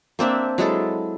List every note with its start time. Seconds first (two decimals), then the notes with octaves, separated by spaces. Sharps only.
0.19 A#3 C4 D4 E5
0.58 F#3 G#3 E4 A4